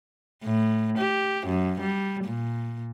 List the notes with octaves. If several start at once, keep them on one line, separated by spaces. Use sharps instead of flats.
A2
G4
F#2
G3
A#2